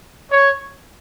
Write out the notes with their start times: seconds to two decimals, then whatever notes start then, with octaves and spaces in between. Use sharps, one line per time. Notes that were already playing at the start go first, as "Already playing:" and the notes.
0.30 C#5